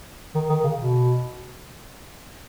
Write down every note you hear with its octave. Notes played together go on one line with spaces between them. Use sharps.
D#3
D#3
C#3
B2